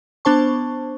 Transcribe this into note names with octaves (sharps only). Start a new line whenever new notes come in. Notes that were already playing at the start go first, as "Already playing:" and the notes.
B3 D4 C5 A5 C#6